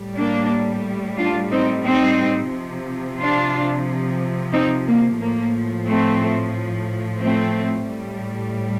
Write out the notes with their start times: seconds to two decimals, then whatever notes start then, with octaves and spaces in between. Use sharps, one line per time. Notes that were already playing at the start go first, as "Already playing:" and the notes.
Already playing: A2 G3
0.17 A#3 D4
1.17 D4 F4
1.51 C4 D#4
1.84 C4 D#4
2.52 C3 F3
3.19 D4 F4
4.52 C4 D#4
4.87 A#3
5.20 A2 F3 A#3
5.87 A3 C4
7.21 A3 C4
7.88 A2 G3